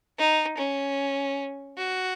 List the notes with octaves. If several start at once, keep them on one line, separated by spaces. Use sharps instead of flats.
D#4
C#4
F#4